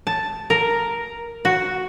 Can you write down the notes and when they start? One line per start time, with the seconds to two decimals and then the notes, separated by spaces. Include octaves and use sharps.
0.07 A5
0.50 A#4
1.45 F#4